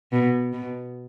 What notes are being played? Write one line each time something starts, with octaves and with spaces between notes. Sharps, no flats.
B2
B2